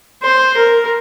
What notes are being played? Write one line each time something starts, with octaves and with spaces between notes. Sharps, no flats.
C5
A#4